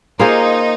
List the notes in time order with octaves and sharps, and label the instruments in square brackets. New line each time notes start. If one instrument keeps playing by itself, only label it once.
[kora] A#3 F4 G#4 C5 [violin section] D#4